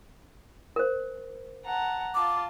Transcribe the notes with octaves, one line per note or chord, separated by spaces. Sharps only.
A#4 C5
F#5 A5 A#5
F4 A5 D6